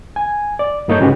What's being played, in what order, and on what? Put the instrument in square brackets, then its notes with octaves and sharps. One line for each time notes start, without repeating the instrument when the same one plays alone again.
[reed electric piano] G#5
D5
G2 A#3 D#4 A4 C#5 G6
G#2 C#3 G#3 F#4 G4 B4